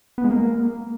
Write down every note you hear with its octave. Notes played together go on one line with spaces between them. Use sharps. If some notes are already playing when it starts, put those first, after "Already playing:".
B3
G#3
A#3